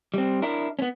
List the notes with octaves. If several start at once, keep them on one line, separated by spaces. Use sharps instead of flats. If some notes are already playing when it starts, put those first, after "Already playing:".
G3 C4
D4 E4 A#4
B3 C#4